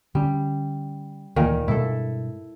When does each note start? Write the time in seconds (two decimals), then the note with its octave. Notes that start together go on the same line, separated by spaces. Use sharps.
0.15 D3 G3 C#4
1.36 D2 A#2 D#3 E3
1.68 G2 B2 G#3 E4 A4